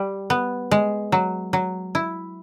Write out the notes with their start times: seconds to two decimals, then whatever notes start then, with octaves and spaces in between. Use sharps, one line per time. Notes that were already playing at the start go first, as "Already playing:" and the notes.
Already playing: G3
0.30 B3
0.71 G#3
1.12 F#3
1.53 F#3
1.95 E4